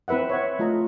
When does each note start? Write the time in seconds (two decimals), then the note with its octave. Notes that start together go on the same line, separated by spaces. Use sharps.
0.08 C4 E4 B4 E5 F#5
0.29 C#5 E5 F#5
0.59 A3 F4 D#5 A#5